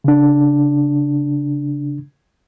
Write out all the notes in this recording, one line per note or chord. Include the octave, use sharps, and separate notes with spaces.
C#3 D4